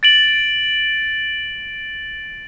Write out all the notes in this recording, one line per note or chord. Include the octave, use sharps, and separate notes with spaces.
A6 D7 F#7